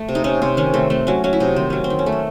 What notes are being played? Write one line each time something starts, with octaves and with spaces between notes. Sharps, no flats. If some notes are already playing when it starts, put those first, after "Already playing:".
Already playing: A3
C3
D#4
C3 C#4
C3 C4
D#3 C#4
A3 C4
A3 C4
F#3 C#4
F#3 C#4
E4
C3 D#4
D#3 C4
F#3 C#4
C4
D#3
C#4
A3
C4